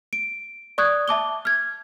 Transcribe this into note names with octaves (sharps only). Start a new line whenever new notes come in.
D7
D5 C#6 D#6 F#6 G#6
E5 A5 D6 G7
F6 G#6